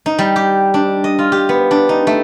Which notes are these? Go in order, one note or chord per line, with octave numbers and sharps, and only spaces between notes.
D#4
G3
G4
D4
D#5
F4
G4
B3
D4
D#4
A3